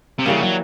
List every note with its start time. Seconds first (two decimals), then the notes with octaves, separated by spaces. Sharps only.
0.19 C3
0.26 C#3 E3 G3 A#3
0.41 F#3